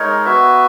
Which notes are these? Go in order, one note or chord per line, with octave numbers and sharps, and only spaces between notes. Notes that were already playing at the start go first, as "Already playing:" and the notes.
Already playing: G#3 D#4 A#4 C#5
B3 F#4 B4 E5